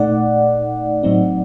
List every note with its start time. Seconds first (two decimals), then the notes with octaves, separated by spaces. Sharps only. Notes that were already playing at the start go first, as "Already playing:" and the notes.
Already playing: A#2 A3 D#4 D5 F#5
1.03 A2 F#3 C4 D#4